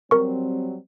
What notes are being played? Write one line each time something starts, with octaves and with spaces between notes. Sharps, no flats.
F#3 G3 C4 A#4 C#6